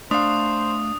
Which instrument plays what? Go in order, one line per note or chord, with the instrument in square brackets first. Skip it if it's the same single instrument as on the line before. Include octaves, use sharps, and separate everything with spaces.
[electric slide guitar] A3 F5 [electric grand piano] D4 [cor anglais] C5 [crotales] D#6